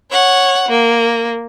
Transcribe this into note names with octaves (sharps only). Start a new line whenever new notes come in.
C#5 F#5
A#3